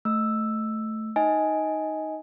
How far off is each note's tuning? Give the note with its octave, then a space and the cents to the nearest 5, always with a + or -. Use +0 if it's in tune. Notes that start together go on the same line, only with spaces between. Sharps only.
A3 +0 E6 +0
D#4 +0 D#5 +20 G#5 +0